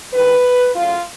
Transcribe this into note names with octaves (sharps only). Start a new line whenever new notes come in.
G2 D#3 G#3 B4
C#3 F#3 A3 F4